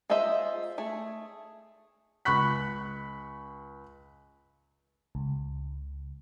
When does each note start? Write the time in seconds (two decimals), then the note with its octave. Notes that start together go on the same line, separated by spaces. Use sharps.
0.10 F4 G#4 C5 D#5 E5
0.78 A3 G#4
2.25 C#2 B5 C#6 F#6 B6
5.15 C#2